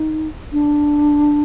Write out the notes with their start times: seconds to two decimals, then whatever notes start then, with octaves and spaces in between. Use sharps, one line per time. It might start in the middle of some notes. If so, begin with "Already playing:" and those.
Already playing: D#4
0.52 D4